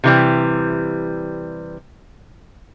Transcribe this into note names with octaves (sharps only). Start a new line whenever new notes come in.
C3 E3 G3